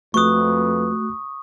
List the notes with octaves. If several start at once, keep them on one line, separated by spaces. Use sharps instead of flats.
F2 A3 F#4 B4 C#6 D#6 F#6